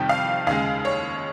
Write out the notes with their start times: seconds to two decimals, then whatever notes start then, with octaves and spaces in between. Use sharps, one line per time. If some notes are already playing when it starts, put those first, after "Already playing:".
Already playing: F2 C3 D#3 G3 G5
0.09 F5
0.47 D#2 C#3 G#3 F5
0.85 C#5